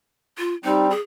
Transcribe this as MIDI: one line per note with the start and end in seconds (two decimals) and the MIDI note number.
0.38 0.54 65
0.65 0.92 55
0.65 0.92 60
0.65 0.89 63
0.90 1.00 68